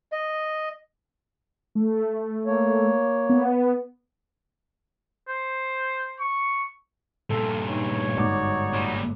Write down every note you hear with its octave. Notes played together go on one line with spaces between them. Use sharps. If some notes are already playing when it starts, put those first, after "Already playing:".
D#5
A3
A#3 C#5
B3
C5
C#6
G2 A#2 A4
D#4 C#5
G1 G#2 D#4 F#4 D5 D6
A#2 G3